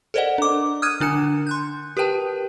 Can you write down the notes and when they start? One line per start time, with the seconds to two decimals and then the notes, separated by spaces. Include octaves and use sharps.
0.14 A4 A#4 C5 D5 D#5 F#5
0.38 D4 D6
0.82 D#6 F6 F#6 G#6 D#7
1.00 D3 D4 G#5 C#7
1.47 C6 F#6 G6
1.97 G4 A#4 B4 G5 A5